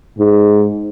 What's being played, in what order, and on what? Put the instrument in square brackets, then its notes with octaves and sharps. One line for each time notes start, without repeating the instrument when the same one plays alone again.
[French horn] G#2